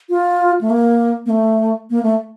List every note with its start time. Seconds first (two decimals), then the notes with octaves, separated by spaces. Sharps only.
0.09 F4
0.61 A3
0.70 A#3
1.26 A#3
1.30 A3
1.90 A#3
2.03 A3